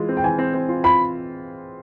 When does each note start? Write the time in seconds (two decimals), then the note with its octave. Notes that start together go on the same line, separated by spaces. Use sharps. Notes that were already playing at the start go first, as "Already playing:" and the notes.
Already playing: E3 G#3 F4
0.09 C4
0.17 G5
0.23 E3 G#5
0.39 C4
0.54 C4
0.69 F4
0.84 F4 B5